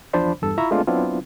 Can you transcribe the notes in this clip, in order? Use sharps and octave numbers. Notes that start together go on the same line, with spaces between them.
E2 F3 D4 C5 D5 B5
E2 G2 A4 E6
E4 F4 E5 A#5 B5 C#6
G#3 A3 B3 C4 D4 F4
F#3 B3 C4 D4 E4 F4